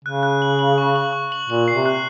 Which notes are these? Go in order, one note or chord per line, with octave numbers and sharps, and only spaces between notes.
C#3 F#6
F#6
F#7
F#7
C#6
F#7
C#6
F#7
A#2 F#7
C7
C3
F#6